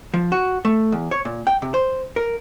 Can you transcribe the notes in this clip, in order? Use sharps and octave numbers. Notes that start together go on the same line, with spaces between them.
F3
F#4
A3
E2
C#5
A#2
G5
C3
C5
A#4